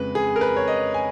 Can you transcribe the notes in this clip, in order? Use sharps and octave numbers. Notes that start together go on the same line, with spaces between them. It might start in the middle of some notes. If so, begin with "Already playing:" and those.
Already playing: F2 C#3 G#3 B4
G#4
A#4
B4
C#5
D#5
G#5